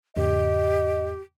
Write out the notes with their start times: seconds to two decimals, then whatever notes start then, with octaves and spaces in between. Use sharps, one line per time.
0.17 E2 G#2 C#3 G4 D#5